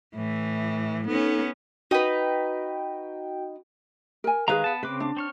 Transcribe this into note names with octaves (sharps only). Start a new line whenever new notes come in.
A2 E3
B3 C#4 D#4 A4
D#4 F#4 B4 G5
A#4 G#5
D#3 G#3 G#4 B4 F5 A#5
B3 A5
C#3 C4 B4 D6
D4
C4 C#5 F6